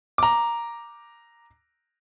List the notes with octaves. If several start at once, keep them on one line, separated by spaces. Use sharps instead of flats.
A#5 D6